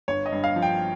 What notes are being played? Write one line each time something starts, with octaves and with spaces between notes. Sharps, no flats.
G1 C#5
D#5
G2
F5
F3
G5